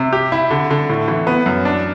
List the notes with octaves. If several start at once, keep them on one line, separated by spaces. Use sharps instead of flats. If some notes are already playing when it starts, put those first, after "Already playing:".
Already playing: C3
G4
E4
D3
D3
A2
E3
B3
F#2
D4